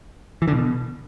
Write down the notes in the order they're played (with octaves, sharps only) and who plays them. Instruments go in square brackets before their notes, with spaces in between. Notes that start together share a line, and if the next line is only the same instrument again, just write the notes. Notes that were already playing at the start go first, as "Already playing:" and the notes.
[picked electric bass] E3
D3
B2